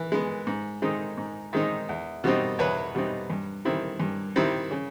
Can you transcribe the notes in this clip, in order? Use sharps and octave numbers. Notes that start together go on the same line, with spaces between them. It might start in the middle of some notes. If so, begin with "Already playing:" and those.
Already playing: E3
G#3 B3
G#2
D#3 G#3 C4 D#4
G#2
D#3 G#3 C4 D#4
E2
B2 G3 C4 D#4
E2 B4 C#5
B2 G3 C4 D#4
G2
D#3 G3 C4 E4
G2
D#3 G3 C4 E4
C#3